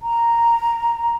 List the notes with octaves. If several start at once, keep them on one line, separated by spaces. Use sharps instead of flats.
A#5